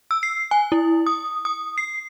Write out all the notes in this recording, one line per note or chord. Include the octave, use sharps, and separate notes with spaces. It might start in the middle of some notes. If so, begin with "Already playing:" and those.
E6
C7
G#5
E4
D#6
D#6
C7